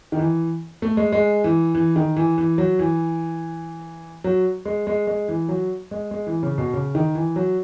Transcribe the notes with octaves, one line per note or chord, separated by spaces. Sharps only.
D#3
E3
A3
G#3
G#3
E3
E3
D#3
E3
E3
F#3
E3
F#3
G#3
G#3
G#3
E3
F#3
G#3
G#3
E3
C#3
B2
C#3
D#3
E3
F#3